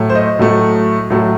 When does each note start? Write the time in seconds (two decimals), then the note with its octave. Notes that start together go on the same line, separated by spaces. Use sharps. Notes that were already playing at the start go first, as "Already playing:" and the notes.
Already playing: A2 F#3 A3
0.10 C5
0.15 D#5
0.39 A2 F#3 A3
1.10 A2 F#3 A3